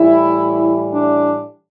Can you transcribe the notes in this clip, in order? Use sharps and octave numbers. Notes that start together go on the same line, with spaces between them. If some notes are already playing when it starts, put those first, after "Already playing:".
Already playing: A2 E3 G3 E4
D4